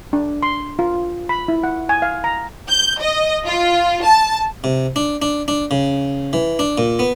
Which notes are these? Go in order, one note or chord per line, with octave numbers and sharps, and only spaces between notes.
D4
C6
F4
B5
E4
F#5
G#5
F5
A#5
G6
D#5
F4
A5
C3
D4
D4
D4
C#3
E3
D4
A#2
B3